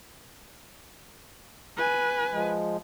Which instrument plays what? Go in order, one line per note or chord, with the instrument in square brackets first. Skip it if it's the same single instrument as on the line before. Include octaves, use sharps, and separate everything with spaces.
[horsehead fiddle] B4 G#5
[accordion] F3 G#3